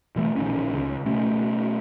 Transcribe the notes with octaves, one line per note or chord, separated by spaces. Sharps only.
B2 E3 A3
A#1 D#3 C#4
C#2
B2 A3 C#4